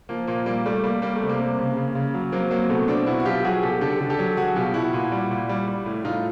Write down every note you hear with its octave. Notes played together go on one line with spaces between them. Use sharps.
F3 A#3
A#2 A#3
G3 A#3
G3 A3
G3 A#3
G3 A#3
A3
C3
A#3
C3
C#3
C#3
C#3
F#3
F#3 A#3 C4
F#3 A#3
C4
B2 A3 B3
B2 C4 D4
B2 E4 F#4
F#4
F#3 F4 G4
F#3 F#4 G#4
B2 G4 A4
D3 G4 A4
D3
G4 A4
F#3
F#3 F#4 G#4
B2 F4 G4
B2 E4 F#4
A#2
G3
A#2
G3
G3
A2
A2 D#4 F4